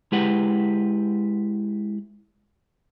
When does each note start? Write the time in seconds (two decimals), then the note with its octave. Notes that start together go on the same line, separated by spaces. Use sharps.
0.12 G#3 E4 G4 B4 F#5